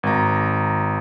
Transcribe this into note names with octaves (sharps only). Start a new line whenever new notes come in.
G#1 A#5